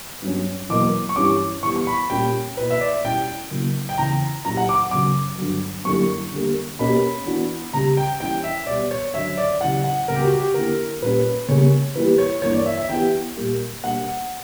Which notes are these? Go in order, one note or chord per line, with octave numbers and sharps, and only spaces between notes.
G2 F#3 C#4
E2 B2 F#3 A#3 D6
C#6
G2 E3 G3 C#4 D6
E3 G3 B3 C#6
C#6
B5
A#2 G3 C#4 G4 G5
B2 A#3 E4 B4
E5
D5
B2 G3 C#4 E4 G5
C#3 F#3 A#3 E4
G5
E2 C#3 E3 A#5
A#2 F#3 C#4 E4 G4 A#5
F#5
D6
F#2 C#3 F#3 D6
G2 D3 F#3
F#2 D3 G3 A#3 E4 C#6
D3 G3 A#3
B2 A#3 C#4 G4 B5
E3 B3 D4 F#4
C#3 G3 C#4 G4 A#5
G5
E3 G3 C#4 G5
E5
B2 G3 B3 D5
C#5
F#2 D3 F#3 E5
D5
C#3 F#3 C#4 E4 G4 F#5
F#5
C#3 G3 B3 A#4
G4
F#4
G4
D3 A#3 E4 G4 A#4
A#2 G3 C#4 B4
C#3 G3 A#3 C#4 C#5
E3 G3 A#3 E4 G4 B4
C#5
G2 E3 A#3 C#5
D5
E5
E5
E3 B3 E4 G4 G5
A#2 G3 A#3
B2 G3 A#3 D4 F#5